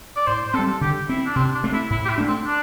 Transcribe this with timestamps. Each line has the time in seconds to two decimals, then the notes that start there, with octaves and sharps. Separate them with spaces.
0.16 D5
0.27 A2 C5
0.47 C5
0.54 C4 A4
0.59 G3
0.81 D3 G4
1.09 C4 E4
1.26 D4
1.36 C3 C4
1.54 D4
1.64 A3 C4
1.73 E4
1.90 A2 E4
2.05 G4
2.09 E4
2.18 A3 D4
2.27 C4
2.45 D4